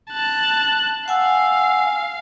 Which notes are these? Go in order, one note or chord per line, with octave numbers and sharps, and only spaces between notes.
A5 F#6
F5 F#5 G#5 E6